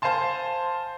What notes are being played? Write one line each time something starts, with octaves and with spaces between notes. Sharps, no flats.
C5 F5 G#5 A5 C6